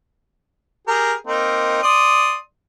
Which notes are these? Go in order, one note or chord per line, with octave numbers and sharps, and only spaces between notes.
G4 G#4 A#4
A#3 C4 D#4
D5 C6 D#6